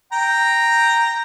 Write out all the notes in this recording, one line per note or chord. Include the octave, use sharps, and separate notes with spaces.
G5 A#5